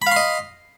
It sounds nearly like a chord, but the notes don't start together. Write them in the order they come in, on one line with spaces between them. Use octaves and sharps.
B5 F5 C6 D#5